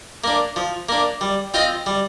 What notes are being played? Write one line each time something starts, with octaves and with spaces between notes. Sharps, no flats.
A#3 D4
F3
A#3 D4
G3
C4 F4 C5 D#5
G3